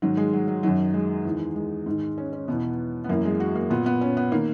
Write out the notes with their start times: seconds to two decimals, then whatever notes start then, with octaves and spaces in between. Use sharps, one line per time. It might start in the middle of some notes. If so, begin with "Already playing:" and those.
0.02 G#2 D#3 F#3
0.17 G#3
0.33 F#3
0.48 F#3
0.63 F#2 D#3 F#3
0.94 G#3
1.25 E2 D#3
1.56 G#3
1.86 G#2 D#3
2.18 C#4
2.33 C#4
2.48 E2 B2 B3
3.04 B3
3.09 F#2 E3 A#3
3.25 G#3
3.40 F#4
3.55 A#3
3.70 A#2 B3
3.86 B3
4.01 C#4
4.17 B3
4.32 D#3 A#3